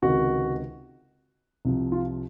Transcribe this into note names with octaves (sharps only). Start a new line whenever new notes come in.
C#2 C3 D#3 F#4
C2 C3 F3
F4